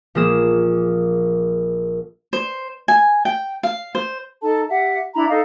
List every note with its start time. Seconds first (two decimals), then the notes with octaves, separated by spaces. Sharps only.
0.15 A#1 F3 A#3 G#4 D#6 E7
2.33 C5
2.88 G#5
3.25 G5
3.63 F5
3.95 C5
4.42 D#4 A4 A5
4.70 G4 E5 F#5
5.14 D4 E4 A#5 B5
5.30 D#4 A4 D#5 F5